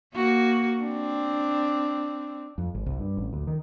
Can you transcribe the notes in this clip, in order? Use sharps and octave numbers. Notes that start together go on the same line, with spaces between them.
A#3 F#4
C4 D4
F2
G#1
C2
G2
A1
D2
D#3